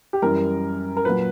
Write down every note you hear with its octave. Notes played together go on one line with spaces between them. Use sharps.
G4
F#2 E3 G3 A#4
A#4
A#2 F#3 B4